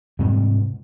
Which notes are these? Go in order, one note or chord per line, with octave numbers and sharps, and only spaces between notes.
G#2 C3 G3 G#3